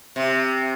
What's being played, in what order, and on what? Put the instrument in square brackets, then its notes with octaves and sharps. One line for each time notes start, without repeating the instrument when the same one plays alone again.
[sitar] C3